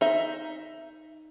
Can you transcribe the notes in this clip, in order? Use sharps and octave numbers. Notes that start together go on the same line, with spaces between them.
D#4 E5